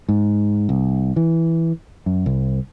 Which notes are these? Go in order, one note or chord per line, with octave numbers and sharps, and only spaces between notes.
G#2
C2
E3
F#2
C2